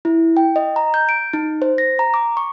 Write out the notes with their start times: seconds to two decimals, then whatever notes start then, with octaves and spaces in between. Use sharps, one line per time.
0.05 E4
0.37 G5
0.56 D#5
0.76 A#5
0.94 G6
1.09 D7
1.33 D#4
1.62 C5
1.78 A#6
1.99 A#5
2.14 D6
2.37 C#6